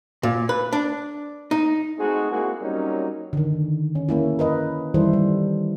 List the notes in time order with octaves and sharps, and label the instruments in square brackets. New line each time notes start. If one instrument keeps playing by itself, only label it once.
[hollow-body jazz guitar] A#2
B4
D4
D#4
[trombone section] G#3 A3 C4 D#4 F#4 G#4
G#3 A#3 C4 E4 F#4 G#4
F#3 G3 A#3 C4 C#4 D#4
[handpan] D3 D#3
C#4
A#3 C#4 E4
A#4 B4 D#5
D#3 E3 G3 E4 A4 C5
G3